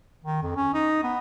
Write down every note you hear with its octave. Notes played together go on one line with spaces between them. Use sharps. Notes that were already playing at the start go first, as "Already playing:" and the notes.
D#3
F2
C#4
D#4
B3